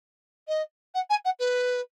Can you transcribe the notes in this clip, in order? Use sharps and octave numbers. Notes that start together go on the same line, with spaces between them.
D#5
F#5
G#5
F#5
B4